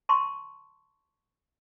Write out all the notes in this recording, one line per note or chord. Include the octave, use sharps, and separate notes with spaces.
A5 C6 C#6